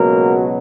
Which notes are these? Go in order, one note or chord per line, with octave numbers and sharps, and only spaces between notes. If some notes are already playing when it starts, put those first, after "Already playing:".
Already playing: C#2 B2 F#3 A#3 A#4